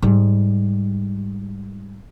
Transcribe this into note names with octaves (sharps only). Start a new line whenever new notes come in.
G#2 G3